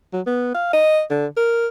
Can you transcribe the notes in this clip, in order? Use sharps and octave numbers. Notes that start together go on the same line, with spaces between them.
F#3
B3
F5
D#5
D3
A#4